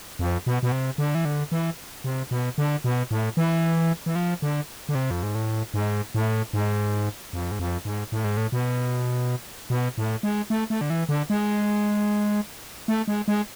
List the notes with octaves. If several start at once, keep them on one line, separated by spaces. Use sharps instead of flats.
F2
B2
B2
C3
D3
E3
D3
E3
C3
B2
D3
B2
A2
E3
E3
F3
D3
D3
C3
F2
G#2
A2
G#2
A2
G#2
F2
G#2
F2
G#2
A2
G#2
A2
B2
B2
A2
G#3
A3
A3
D3
E3
D3
G#3
A3
G#3
G#3